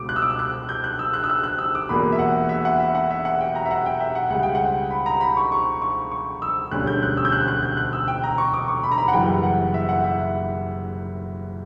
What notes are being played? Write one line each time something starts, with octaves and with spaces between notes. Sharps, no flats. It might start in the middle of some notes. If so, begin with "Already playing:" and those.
Already playing: C#2 B2 G3 D6
F#6
E6
D6
E6
F#6
G6
F#6
E6
F#6
E6
F#6
F#6
E6
D6
E1 E2 B2 A#3 B5
E5
F#5
E5
F#5
E5
F#5
E5
F#5
G5
A#5
E5
F#5
G5
E5
F#5
C#2 C#3 G3 F#5
G5
F#5
B5
A#5
B5
C#6
C#6
C#6
C#6
E6
E1 D2 D3 G3 C#4 F#6
G6
F#6
E6
G6
F#6
F#6
G6
F#6
E6
G5
A#5
C#6
D6
C#6
B5
A#5
B5
F#5
F#1 F#2 E3 G3 G5
F#5
E5
F#5
E5